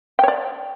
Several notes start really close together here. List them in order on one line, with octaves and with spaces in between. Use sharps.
G5 C#5 D5